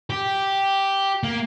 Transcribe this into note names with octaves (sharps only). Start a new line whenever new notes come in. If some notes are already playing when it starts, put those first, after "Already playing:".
G4
A#3